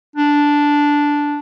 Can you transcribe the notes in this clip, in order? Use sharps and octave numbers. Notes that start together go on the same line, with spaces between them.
D4